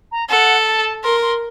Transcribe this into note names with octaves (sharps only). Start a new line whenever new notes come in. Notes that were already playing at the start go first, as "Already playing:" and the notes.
A#5
A4 F#5
A5
A#4 C6
C6